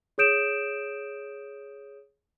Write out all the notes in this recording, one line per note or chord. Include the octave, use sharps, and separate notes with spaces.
G#4 C#5 D#6 G6 D7 E7